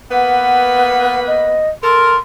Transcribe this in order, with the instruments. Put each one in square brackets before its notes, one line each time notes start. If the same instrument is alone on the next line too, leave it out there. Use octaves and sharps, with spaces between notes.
[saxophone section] A#3 B3 B4 [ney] F#5
[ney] D#5
[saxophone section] A4 A#4 [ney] C6